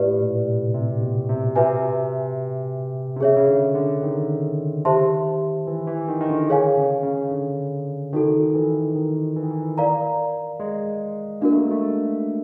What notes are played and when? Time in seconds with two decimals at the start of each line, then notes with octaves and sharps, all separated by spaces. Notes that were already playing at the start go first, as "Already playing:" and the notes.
Already playing: A2 G4 B4 D5
0.20 A#2
0.47 C3
0.74 C3
1.01 B2
1.29 C3
1.56 C3 F#4 B4 E5 G#5
3.16 C3
3.20 C#3 G#4 C#5 E5
3.36 C#3
3.47 D3
3.75 D3
4.03 D#3
4.85 G4 C5 E5 A5 C6
5.67 E3
5.87 E3
6.08 D#3
6.20 D#3
6.29 D3
6.49 G#4 C#5 F5 G#5
6.77 C#3
7.03 C#3
7.31 D3
8.13 D#3 D#4 F#4 A4
8.54 E3
8.95 D#3
9.36 E3
9.43 D#3
9.51 E3
9.78 A#4 D5 F5 A#5
10.60 G#3
11.41 A#3 D4 F#4 A#4
11.52 A3
11.62 G#3
11.71 A3